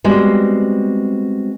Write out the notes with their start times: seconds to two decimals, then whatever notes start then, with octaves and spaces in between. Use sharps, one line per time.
0.04 G3 G#3 B3 C4 F#4